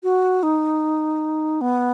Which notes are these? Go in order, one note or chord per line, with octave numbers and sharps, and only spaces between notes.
F#4
D#4
B3